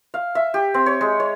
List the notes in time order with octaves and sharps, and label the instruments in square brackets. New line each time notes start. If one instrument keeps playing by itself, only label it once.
[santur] F5
E5
G4
C4
C#5
G#3
C#5